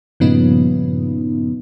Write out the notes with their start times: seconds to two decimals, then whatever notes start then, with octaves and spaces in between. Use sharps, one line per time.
0.20 G2 A#2 C#3 F3 B3 D#4